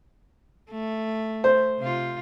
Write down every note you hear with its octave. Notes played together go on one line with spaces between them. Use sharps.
A3
C5
C3 F4